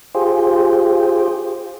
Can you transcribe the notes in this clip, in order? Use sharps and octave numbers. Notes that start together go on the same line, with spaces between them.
F4 G4 G#4 C5